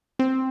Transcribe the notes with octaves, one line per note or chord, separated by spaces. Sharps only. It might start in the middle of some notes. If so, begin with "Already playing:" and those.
C4